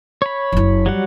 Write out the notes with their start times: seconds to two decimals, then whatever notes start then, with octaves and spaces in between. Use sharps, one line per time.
0.22 C#5 B5
0.52 F#1 E4
0.86 F#3 G3 F#5